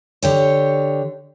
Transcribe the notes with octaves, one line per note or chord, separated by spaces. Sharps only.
D3 G4 C#5